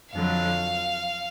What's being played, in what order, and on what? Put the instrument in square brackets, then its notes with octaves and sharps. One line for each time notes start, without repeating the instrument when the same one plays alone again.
[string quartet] F2 D3 F#3 F5